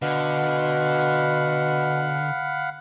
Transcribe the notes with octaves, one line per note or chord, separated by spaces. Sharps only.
B2 D3 F5 F#5 B5